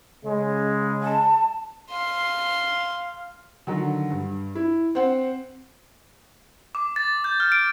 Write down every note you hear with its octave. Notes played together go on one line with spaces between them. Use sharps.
C#3 G#3
A5
F5 C6
D3 D#3 F#3
G2
E4
C4 C5 F#5
D6
A6
G6
F6
D7